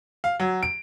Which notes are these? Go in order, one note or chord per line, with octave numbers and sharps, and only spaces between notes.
F5
F#3
D7